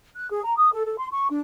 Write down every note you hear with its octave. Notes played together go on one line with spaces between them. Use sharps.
F#6
G#4
A#5
D#6
A4
A4
C6
C#6
D4